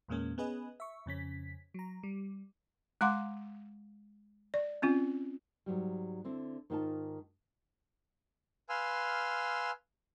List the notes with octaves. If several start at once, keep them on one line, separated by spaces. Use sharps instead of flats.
E2 A#2 G#3 A#3 C#4
B3 C#4 G#4 B4 D#5
E5 C#6
F2 C#3 C#4 B6
F#3 A#5
G3
G#3 F5 F#5 A#5 C6 D6
D5
C4 C#4 F4
G#2 F#3 G3
D3 C4 E4
G#2 D#3 D#4 F4 A5
B4 F5 G#5 C6 E6 F6